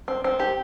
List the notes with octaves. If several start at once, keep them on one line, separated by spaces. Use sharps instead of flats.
C4
C4
G4